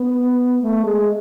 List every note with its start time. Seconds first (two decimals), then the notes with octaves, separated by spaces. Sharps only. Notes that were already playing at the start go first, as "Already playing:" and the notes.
Already playing: B3
0.62 A3
0.85 G#3